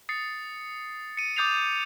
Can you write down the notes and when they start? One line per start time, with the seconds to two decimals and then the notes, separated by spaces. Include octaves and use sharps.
0.09 D#6 A6 C7 C#7
1.17 C#7 D#7
1.36 D6 D#6 G6 A6 C7 F7